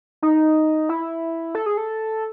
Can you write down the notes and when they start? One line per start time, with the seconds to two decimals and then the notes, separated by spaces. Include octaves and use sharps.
0.23 D#4
0.89 E4
1.55 A4
1.66 G#4
1.77 A4